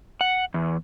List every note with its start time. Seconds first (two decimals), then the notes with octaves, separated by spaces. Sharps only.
0.21 F#5
0.54 E2